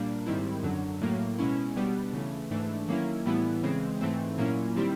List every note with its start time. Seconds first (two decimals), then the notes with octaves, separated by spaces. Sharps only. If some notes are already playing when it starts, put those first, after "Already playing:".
Already playing: A#2 G3 A#3 D4
0.26 G#2 D#3 G3 C4 E4
0.63 F#2 D3 F#3
1.02 A2 F#3 A#3
1.38 B2 G#3 C#4 E4
1.76 B2 G3 B3 D4
2.13 C#3 E3 A3
2.51 G#2 E3 A3 D4
2.88 D#3 F#3 A#3 C#4 E4
3.26 A2 E3 G3 B3 E4
3.63 C#3 E3 G#3 C4
4.01 G#2 E3 A3 C4
4.38 A#2 F#3 A#3 C#4 E4
4.76 D#3 G3 C4 E4